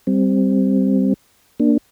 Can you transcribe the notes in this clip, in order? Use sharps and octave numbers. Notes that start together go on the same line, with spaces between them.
G3 C4
A#3 D4